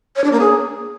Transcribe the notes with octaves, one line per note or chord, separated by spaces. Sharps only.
C#5
D4
A#3
G#4